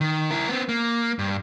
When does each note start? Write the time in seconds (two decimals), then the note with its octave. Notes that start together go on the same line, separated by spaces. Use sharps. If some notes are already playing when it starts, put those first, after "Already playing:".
0.01 D#3
0.31 E4 A#4
0.49 B3 C4
0.69 A#3
1.19 G2